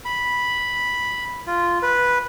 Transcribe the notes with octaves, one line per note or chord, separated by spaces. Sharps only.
B5
F4
B4